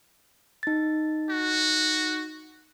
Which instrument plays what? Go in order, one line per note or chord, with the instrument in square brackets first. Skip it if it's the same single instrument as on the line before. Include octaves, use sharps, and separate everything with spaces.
[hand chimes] D#4 A6
[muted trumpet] F#4